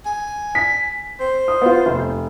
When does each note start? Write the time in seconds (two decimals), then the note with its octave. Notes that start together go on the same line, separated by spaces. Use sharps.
0.05 G#5
0.55 B6
1.20 C5
1.48 D#6
1.62 B3 F4
1.86 F1